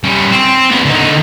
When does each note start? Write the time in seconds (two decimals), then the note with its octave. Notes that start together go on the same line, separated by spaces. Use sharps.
0.04 G3 C#4
0.32 C4
0.71 E2 B3
0.85 D3 D#4